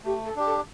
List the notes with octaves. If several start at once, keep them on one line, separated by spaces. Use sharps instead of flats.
A3 G4
A4
D4 G4
A4